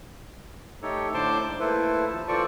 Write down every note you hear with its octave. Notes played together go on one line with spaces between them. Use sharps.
A3 D#4 G4 A4 C#5
A2 D3 C5 A5 C6 D6
G#2
A3 A#3 E4 A4 B4 C5
D#2 F3 A5
E3 F4 A4 C5 D5 C#6